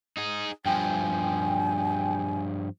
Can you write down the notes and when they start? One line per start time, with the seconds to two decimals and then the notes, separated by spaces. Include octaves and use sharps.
0.17 D#4 G#4
0.66 G2 F3 G5 G#5